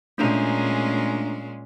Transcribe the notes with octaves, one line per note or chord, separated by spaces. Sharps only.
A#2 G#3 A3 C#4 D4 A#5